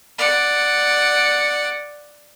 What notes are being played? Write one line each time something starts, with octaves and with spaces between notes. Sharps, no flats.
D5 F#5